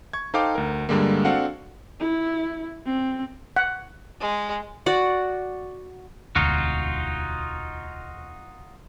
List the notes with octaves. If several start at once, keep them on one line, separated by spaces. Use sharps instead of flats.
C#6 G#6
D#4 A4 C5 F5 G5 D6
D2 A#4
G2 D3 G3 G#3 A#3
C4 D4 F#4 A4 F5 F#5
E4
C4
F#5
G#3
F#4 D5 F#5
E1 D2 D#4 F4 F#4